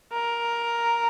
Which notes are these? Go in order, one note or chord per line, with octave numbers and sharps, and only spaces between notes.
A#4